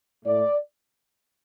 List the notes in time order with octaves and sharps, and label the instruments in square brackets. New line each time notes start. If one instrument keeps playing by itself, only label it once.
[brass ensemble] A2 A3 D5